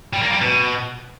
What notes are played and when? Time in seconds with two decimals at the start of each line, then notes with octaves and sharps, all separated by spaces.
0.13 G3
0.22 A#3
0.32 G3
0.41 B2